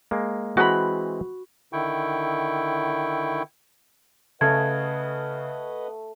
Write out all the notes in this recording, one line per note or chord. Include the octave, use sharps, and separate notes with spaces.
G#3 A#3
E3 G#3 C4 F#4 B5
D3 D#3 E4 G5 C#6
C#3 A3 B4 D#5 F#5 G#6